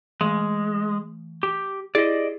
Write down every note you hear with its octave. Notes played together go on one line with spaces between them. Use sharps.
E3 G#3 A3
G4
E4 G4 G#4 D5 D#5